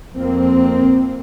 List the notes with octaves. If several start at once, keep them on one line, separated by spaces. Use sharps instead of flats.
F2 A#3 C4